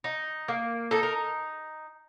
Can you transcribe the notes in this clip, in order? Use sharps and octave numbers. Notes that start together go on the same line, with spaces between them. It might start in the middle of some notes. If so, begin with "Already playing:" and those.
D#4
A#3
D#4 A4
A#4